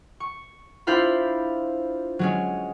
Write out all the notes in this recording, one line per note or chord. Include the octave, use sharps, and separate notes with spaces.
C#6
D4 E4 F4 C5 F5 B5
F#3 G#3 C#4